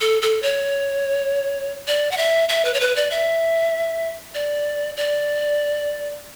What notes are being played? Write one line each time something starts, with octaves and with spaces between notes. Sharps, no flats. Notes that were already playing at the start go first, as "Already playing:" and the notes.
A4
A4
C#5
D5
F#5
E5
E5
B4
C#5
B4
D5
E5
D5
D5